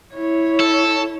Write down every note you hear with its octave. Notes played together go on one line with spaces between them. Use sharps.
E4 C#5
A4